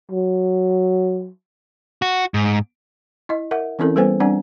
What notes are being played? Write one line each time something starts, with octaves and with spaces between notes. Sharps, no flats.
F#3
F#4
G#2
E4 D#5
A#4 E5 F#5
E3 C4 C#4 E4 A4 A#4
G3 B3 A4 B4 C5 G#5
G3 C4 D4 D5 F#5 G#5